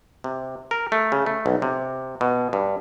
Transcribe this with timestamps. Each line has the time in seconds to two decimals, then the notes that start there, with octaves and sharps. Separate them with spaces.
0.24 C3
0.71 A#4
0.92 A3
1.12 C#3
1.26 A3
1.46 B1
1.62 C3
2.21 B2
2.53 G2